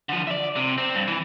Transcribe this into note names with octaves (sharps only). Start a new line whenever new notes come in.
D3 F3
D5 E5
C3
C4
G2
E3